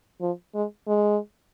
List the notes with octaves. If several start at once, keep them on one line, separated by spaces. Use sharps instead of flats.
F3
G#3
G#3